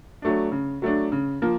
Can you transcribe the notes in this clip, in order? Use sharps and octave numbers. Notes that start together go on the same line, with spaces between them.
F#3 A3 D4
C#3
F#3 A3 D4
C#3
F3 A#3